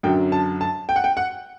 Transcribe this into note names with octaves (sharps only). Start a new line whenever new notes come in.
F#2 D3 F#3 G5
A5
A5
G5
F#5
G5
F#5